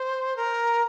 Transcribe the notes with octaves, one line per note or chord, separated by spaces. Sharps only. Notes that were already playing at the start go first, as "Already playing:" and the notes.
Already playing: C5
A#4